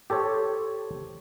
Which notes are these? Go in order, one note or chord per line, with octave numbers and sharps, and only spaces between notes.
G4 A4 C5 C#5